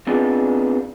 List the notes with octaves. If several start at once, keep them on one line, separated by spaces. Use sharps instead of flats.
B3 C4 D4 D#4 F4 G#4